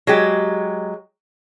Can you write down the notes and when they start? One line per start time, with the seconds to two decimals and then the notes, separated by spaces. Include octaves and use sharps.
0.07 F#3 G#3 G4